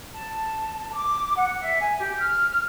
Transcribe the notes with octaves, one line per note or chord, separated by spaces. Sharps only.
A5
D6
F#5
E5
G#5
G4
F6